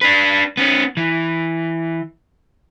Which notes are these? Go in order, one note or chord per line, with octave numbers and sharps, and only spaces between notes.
D4 B4
B3 C#4
E3